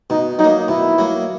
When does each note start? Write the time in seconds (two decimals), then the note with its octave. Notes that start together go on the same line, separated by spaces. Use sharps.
0.10 B2 D#4
0.39 F#3 D#4
0.44 A#3
0.68 B2 E4
0.98 F#3 A#3